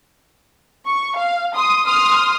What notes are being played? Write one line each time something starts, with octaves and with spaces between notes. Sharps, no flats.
C#6
F5
C6 D#6
C6 D#6 F6